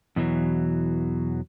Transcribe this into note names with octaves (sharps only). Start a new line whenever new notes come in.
E2 B2 E3 F#3